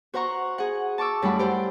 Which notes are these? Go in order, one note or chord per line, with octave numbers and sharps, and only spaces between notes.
F#4 C5 F#5 A#5 C#6
G#4 F#5
A5 C#6 D6 E6
F#2 G3 A3 E4 F#5 B5
G4 C5